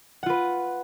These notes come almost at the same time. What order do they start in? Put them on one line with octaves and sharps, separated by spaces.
F#5 F4 B4